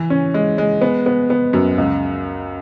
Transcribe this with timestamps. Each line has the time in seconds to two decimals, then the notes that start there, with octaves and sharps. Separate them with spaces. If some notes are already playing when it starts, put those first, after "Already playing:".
Already playing: E3
0.10 C#4
0.34 G#3
0.58 G#3
0.81 B3
1.06 B3
1.30 B3
1.53 F#2
1.78 C#2